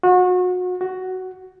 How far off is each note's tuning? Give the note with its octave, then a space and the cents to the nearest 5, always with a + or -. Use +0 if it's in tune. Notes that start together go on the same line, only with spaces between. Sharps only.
F#4 -30
F#4 +10